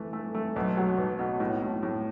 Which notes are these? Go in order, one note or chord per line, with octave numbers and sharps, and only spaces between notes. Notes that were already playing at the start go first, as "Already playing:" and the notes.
Already playing: E3 A3
A3
A3
B1
F#3
B1
B2
A2
A2
A2